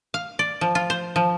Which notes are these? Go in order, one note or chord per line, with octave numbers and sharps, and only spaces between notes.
F5
D5
F3
F4
C5
F3